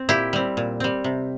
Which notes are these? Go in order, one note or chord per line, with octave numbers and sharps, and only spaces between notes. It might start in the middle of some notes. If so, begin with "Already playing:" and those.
Already playing: C4
A#2 E4 G4
G3 C4
A#2
G3 C4
C3